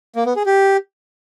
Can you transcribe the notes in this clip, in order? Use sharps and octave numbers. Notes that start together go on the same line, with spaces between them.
A#3
B3
G#4
G4